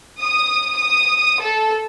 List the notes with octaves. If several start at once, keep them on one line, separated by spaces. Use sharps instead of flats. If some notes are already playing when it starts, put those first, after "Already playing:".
D#6
D#6
A4